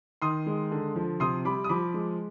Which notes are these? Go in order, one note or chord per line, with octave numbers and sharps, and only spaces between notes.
D#3 C6 D#6
G#3
D3
F3
C3 C6 D#6
G3 B5 D6
D#6
F3 B5 D6
G#3